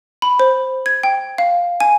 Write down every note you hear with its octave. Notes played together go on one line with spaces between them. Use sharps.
B5
C5
G#6
G5
F5
G#5